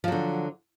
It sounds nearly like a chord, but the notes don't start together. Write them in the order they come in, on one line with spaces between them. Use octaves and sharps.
F3 F#3 D3